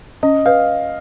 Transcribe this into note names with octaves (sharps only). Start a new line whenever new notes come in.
C#4 D#5
B4 F5